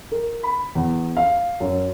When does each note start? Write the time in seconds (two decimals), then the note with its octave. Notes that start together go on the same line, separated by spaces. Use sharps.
0.12 A#4
0.43 B5
0.75 E2
1.17 F5
1.60 F#2